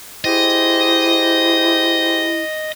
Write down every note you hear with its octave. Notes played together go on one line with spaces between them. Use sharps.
E4 G4 G#4 C5 D#5